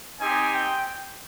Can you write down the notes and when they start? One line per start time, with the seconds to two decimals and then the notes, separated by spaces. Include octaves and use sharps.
0.21 C4 D#4 G4 G#5
0.54 G5